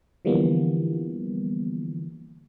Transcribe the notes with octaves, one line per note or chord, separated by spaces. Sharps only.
D3 E3 F3 G3 A#3 B3